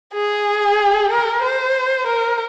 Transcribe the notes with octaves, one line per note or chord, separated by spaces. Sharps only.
G#4
A#4
C5
A#4